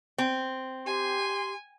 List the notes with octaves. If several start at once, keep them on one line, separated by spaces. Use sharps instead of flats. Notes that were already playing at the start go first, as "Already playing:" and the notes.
C4
G4 G#5 C6